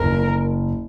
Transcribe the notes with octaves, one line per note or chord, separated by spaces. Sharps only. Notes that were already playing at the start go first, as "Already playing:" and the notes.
Already playing: F#1 A#4